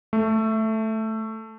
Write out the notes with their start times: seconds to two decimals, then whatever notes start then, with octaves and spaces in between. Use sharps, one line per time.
0.13 A3